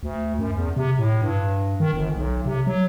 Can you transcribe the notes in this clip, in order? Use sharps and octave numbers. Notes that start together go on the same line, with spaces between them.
D2
F#2
E2
C3
A2
G2
D#3
G1
B1
C3
F#3